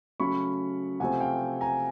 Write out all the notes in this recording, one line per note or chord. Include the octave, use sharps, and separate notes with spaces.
C#3 F#3 A3 C#4 B5 C#6
C3 F3 A3 C4 F#5 G#5
F5 G5
G#5 A#5